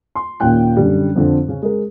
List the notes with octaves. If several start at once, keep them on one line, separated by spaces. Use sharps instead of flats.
C6
D#2 A#2 C#4 G5 F#6
F#2 D3 G3
F2 D3 C4
C#3 C#4
G#3 A#4